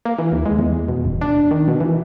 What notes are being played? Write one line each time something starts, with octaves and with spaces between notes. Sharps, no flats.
A#3
E3
D#2
G#3
E2
B2
D#1
D4
D#3
B2
E3